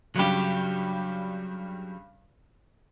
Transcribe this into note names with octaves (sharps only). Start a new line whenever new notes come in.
G2 C#3 F#3 G3 G4